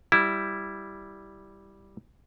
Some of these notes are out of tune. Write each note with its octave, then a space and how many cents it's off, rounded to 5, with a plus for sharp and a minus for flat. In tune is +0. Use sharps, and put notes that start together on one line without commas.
G3 +0 E4 +0